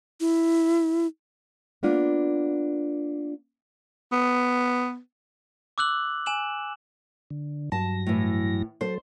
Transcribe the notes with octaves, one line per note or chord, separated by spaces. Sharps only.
E4
A#3 B3 D4 F4
B3
D6 E6 F#6 F#7
G#5 E7 F#7
D3
G2 F#3 A5 A#6
A2 E3
F#3 A4 C5